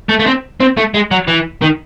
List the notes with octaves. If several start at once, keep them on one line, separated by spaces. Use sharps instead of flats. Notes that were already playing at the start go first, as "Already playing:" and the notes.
A3
A3
C4
C4
A3
G#3
F#3
E3
D#3